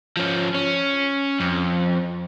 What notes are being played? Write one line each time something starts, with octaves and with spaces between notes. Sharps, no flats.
F3 C#4
C#4
F2